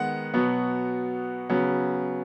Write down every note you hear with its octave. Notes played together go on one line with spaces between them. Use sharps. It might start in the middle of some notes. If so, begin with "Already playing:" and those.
Already playing: D#3 G#3 B3 F#5
B2 F#3 B3
C#3 F#3 B3